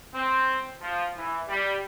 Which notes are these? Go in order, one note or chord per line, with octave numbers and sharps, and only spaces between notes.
C4
F3
E3
G3